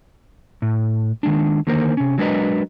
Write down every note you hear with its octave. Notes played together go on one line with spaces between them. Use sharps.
A2
D#3 G#3 D4
D3 D#3 A#3 A#4 C5
C3 C#4
F#3 G#3 D4 A#4 B4 D#5